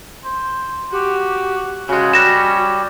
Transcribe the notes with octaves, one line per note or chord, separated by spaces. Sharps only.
C5
F#4 G4
C#3 G#3 C#4 F#4
G3 F#6 A#6 E7